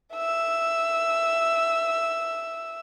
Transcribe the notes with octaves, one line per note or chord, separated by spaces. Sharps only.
E5 E6